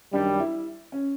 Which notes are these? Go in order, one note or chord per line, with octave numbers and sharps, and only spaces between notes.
F#2 D#3 G3 D4
E4
C#4